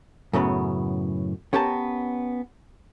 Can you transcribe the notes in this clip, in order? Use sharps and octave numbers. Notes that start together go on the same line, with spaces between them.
F#2 A2 C#3 B3
B3 C#4 G4 A#4 A5